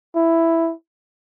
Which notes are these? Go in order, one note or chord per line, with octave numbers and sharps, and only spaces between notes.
E4